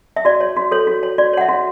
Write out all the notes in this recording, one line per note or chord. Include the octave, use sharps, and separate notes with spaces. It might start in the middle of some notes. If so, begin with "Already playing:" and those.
E5
F#4 D5
C#5
F#4
A4 C#5
F#4
C#5
F#4 D5
C#5 F#5
E5
F#4